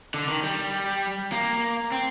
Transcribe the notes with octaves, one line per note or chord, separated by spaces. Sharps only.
D3
D#3
G3
A#3
C4